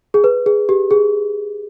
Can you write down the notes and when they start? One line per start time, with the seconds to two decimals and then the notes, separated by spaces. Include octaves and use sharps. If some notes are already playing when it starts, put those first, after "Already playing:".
0.14 G#4
0.24 B4
0.46 G#4
0.69 G4
0.91 G#4